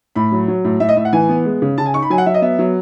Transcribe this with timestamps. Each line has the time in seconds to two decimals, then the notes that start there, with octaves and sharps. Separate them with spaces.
0.16 A2 B5
0.32 F#3
0.48 F#3
0.64 A2
0.80 A2 E5
0.89 D#5
0.96 A2 E5
1.05 F#5
1.13 E3 G#5
1.29 B3
1.45 G#3
1.62 C#3
1.78 C#3 A5
1.86 G#5
1.94 D#4 C#6
2.02 B5
2.10 F#3 G#5
2.18 F#5
2.26 F#3 E5
2.34 D#5
2.42 B3 E5
2.59 F#3